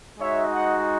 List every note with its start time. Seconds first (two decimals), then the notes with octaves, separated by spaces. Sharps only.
0.18 G#3 D#4 F#4 C#5 E5
0.52 D#5 F#5